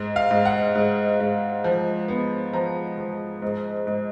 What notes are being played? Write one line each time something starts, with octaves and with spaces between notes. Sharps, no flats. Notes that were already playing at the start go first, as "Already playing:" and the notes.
Already playing: G#2
F5
G#2
F#5
G#2
G#2
F3
B3
F3 A#5
F3
G#2
G#2